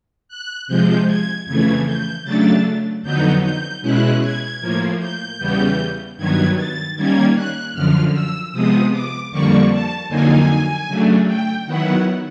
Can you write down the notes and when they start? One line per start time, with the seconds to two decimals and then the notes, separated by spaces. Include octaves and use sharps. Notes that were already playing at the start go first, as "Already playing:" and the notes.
0.29 F#6
0.67 C3 F3 G#3 G6
1.07 G#6
1.46 F2 C#3 E3 A3 G#6
1.85 G6
2.24 C#3 F#3 A3 D4 A6
3.03 F2 D3 F#3 B3 D#4 G6
3.43 G6
3.82 B2 G#3 C#4 E4 F#6
4.21 G#6
4.61 A2 F3 A#3
4.99 G6
5.38 E2 C#3 E3 G3 B3
6.17 G2 D#3 F#3 B3 G#6
6.56 A6
6.96 D#3 G3 A#3 C#4 G#6
7.35 F#6
7.74 F#2 D3 F3 F6
8.13 E6
8.52 C3 F3 G#3 B3 D#6
8.91 D6
9.31 F2 D3 G3 A#3 D4 C#6
9.71 A5
10.09 F2 D3 F#3 A#3 D#4 G#5
10.87 C#3 F#3 A3 D4
11.27 G5
11.66 D#3 F#3 B3 E4 F#5